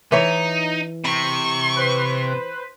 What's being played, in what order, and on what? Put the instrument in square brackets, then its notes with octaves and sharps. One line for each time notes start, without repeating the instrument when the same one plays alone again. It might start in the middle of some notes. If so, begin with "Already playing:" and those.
[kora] E3 C#5 [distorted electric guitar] D#4
[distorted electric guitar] C3 [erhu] C#6
[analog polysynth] B4 C5